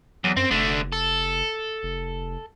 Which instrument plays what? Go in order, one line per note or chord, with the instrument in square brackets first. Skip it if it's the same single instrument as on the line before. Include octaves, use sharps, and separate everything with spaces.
[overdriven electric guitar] E2 [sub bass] F#3
[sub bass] F#2 [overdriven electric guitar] C4
[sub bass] F1 [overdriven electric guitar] D3 A3
[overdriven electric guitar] A4
[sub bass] F1